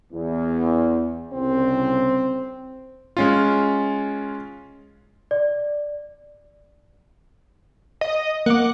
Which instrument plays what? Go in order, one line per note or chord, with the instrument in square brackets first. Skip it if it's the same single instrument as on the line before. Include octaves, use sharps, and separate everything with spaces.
[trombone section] E2
[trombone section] C2 C#3 [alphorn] C4
[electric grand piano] G#3 C#4 F4
[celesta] D5
[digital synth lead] D#5
[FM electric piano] A#3 D6 [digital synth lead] F#5